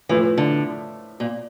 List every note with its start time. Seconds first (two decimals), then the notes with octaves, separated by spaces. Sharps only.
0.09 A2 E3 F3 A3
0.38 D3
1.20 A#2